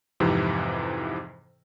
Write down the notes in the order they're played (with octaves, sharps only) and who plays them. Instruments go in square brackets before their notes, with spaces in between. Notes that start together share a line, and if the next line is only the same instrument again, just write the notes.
[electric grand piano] F2 G#2 C3 E3